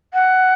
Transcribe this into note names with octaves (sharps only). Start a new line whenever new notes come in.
F#5